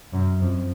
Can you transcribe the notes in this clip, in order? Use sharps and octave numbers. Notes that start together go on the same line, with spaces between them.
F#2
F2